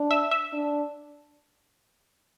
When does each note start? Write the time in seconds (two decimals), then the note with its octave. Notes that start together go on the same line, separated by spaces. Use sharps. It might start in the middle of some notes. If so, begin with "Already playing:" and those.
Already playing: D4
0.11 E5
0.31 E5
0.53 D4